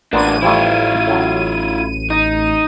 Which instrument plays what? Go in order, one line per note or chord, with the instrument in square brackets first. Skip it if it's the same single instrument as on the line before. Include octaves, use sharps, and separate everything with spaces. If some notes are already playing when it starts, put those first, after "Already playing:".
[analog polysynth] A1 D#7 [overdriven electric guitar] E2 D4 [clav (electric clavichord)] A#3 B3 F4
[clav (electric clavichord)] F3 G3 A3 [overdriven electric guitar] E4 F4
[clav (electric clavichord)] A2 F#3
[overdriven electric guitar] D#4